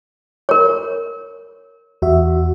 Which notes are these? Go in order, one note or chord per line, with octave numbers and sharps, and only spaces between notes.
A#4 C#5
E2 F#4 E5